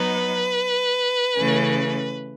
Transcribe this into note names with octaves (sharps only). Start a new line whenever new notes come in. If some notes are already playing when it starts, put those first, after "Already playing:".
Already playing: F#3 B3 D#4 B4
C#3 E3 A3 C#4